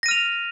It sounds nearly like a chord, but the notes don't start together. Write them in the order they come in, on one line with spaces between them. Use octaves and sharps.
A#6 D#7 F6 F7